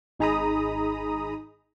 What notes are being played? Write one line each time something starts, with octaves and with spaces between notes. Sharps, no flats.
G#1 D#4 G#4 A#5 B5 D#6